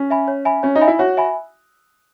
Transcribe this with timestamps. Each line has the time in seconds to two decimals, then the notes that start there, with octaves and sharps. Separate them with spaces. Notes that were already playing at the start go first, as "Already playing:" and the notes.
Already playing: C#4
0.10 E5 G#5 B5
0.28 C#5
0.45 E5 G#5 B5
0.63 C#4 C#5
0.75 D#4
0.81 E5 G#5 B5
0.87 E4
0.99 F#4 C#5
1.17 E5 G#5 B5